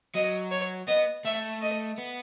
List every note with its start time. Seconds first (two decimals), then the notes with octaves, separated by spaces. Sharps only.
0.14 F#3 D#5
0.51 C#5
0.87 B3 D#5
1.25 A3 E5
1.62 D#5
1.98 B3